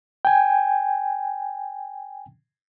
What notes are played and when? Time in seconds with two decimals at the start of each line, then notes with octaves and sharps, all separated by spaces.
0.25 G5 G#5